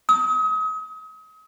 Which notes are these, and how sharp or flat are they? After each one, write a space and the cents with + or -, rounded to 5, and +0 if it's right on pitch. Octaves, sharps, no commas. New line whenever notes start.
D#6 +35